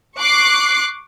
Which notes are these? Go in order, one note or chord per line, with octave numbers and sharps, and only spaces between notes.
C#6 D6 F#6 C7